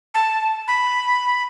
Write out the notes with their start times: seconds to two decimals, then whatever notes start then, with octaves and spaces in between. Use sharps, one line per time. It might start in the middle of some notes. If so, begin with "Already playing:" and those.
0.14 A5
0.68 B5